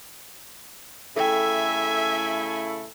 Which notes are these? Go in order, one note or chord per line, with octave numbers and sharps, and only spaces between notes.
C#3 A3 E4 A4 E5 G5 G#5